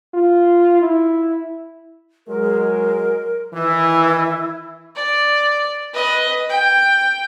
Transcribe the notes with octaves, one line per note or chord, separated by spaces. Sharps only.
F4
E4
F#3 G#3 A#4
D#3 E3 E4
D5
B4 D#5
G5